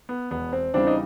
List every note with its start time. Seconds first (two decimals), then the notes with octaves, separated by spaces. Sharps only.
0.09 B3
0.31 E1 B3
0.53 C4
0.74 E2 C#3 E3 G3 C4 D4
0.87 D#4